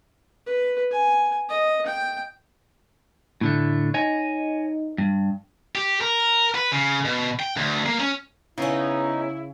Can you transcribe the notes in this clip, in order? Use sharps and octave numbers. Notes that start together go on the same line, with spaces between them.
B4
G#5
D#5
G5
A2 D3 A3
D#4 C#5 D#5 G#5
G2
G4
A#4
B4
C#3
B2
G5
D2
A#3
C#4
C#3 B3 C#4 D#4 E4